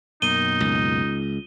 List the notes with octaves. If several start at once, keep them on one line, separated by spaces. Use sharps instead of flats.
F#2 B2 A#3 D#4 D#7 G7
C#2